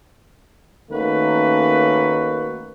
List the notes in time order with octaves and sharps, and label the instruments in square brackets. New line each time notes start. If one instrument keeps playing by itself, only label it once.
[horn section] D#3 A3 A#3 C#4 F#4 B4